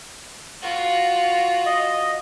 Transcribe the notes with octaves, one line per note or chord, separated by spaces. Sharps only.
F4 F#4
D#5